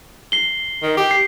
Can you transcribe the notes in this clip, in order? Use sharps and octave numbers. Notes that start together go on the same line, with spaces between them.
C7 G7
D#3
G4
C7